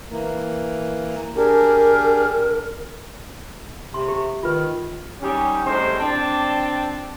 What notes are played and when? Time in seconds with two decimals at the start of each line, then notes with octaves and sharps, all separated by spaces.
0.10 E3 A#3
1.36 D4 G4 G#4 A#4
3.94 C3 C6
4.08 G4
4.43 D#3 F4 B4
5.21 G3 C#4 D#4 G4
5.65 A2 C3 G3 G#3 C4 C5
6.00 C4 D4 G5 A5